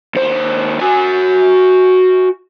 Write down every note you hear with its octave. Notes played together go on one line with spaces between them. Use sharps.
D#2 C5
F#4 G#5